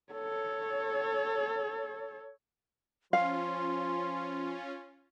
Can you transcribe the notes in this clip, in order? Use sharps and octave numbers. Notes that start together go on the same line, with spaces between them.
A4 C#5
F3 C#4 F4 F5 C6